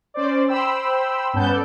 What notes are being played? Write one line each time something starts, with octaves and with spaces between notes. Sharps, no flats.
C#4 C5 D5
C5 G5 B5 E6
G2 B3 C#4 B4 A5 G6
A4 D5